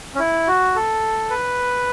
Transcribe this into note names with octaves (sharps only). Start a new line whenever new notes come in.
C#4
E4
F#4
A4
B4